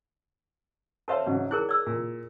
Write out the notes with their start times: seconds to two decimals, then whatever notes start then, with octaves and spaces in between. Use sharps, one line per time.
1.08 A4 C5 C#5 E5 F5 A5
1.26 G#2 C#3 F#3
1.51 E4 G#4 A#4 F#6
1.69 D5 E6
1.86 A#2